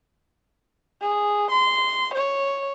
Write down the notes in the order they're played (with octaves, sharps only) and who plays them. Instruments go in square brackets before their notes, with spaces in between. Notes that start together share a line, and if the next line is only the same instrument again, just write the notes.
[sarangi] G#4
C6
C#5